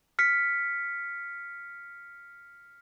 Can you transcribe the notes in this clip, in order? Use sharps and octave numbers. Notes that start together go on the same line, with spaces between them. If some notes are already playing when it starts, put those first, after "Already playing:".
F6 B6 C#7